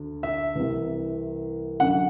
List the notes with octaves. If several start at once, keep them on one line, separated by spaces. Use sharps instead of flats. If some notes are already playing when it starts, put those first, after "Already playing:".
Already playing: D2 D3
E5
C2 C3 E3
F#2 D3 F#5